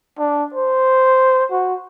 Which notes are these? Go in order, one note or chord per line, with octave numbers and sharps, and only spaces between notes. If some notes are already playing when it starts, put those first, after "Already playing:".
D4
C5
F#4